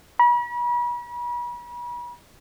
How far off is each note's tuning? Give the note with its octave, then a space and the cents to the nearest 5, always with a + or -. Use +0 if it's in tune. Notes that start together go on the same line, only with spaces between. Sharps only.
B5 -40